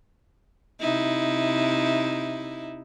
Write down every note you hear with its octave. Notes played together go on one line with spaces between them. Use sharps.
C3 D#4 E4